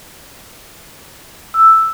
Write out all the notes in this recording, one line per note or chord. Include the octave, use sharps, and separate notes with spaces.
E6